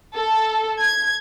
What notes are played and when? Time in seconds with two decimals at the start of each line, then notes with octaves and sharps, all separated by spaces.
0.15 A4
0.80 G#6